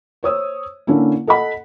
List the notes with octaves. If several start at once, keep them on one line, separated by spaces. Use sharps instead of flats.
C5 C#5 D#6 E6
D3 A#3 C#4 D4 E4
A4 D#5 F#5 B5